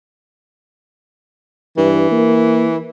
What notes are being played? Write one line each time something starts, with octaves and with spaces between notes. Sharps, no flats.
G2 E3
A#3